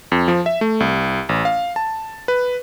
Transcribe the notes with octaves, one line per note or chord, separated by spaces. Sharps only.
F2
F3
E5
A3
C2
A1
F5
A5
B4